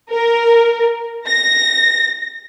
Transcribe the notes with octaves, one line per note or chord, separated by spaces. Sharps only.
A#4
A#6